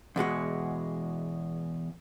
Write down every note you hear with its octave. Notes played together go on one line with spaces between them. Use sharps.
E2 B2 G#3 F#4